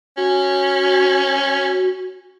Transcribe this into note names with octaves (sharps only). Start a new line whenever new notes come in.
C#4 F#4